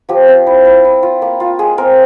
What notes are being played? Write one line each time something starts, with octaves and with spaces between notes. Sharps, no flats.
F3 G4
C4
E4
E4
E4
F4
A#3
F4
G#3 G#4
C4 A#4